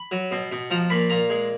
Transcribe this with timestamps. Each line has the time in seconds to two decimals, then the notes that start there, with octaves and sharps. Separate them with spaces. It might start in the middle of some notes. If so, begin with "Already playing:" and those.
Already playing: B5
0.11 F#3
0.31 B2
0.52 B2
0.71 F3 A#5
0.90 A#2 B5
1.10 A#2 A#5
1.30 G#3